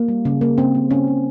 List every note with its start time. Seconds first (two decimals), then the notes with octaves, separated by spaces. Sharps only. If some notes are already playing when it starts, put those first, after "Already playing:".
Already playing: A#3
0.08 G3
0.25 C#3
0.41 A#3
0.58 C#3 C4
0.75 A#3
0.91 C#3 C#4
1.07 C#3